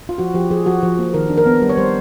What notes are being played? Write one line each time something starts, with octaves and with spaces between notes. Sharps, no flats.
F4
F3 F#4
F3 G4
F3 G#4
F3 F#4
F3
A#3
D#3 A#4
D4
A#4
B3
G3
C#5
G3 C5